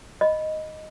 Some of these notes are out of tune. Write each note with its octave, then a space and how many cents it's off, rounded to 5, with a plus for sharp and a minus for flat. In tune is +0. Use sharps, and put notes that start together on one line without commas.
D#5 +0 B5 +0